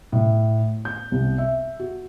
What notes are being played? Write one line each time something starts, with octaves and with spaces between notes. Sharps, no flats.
A2
G6
C2
E5
F#4